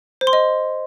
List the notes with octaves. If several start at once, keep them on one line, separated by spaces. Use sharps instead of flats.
C5
C6
D#5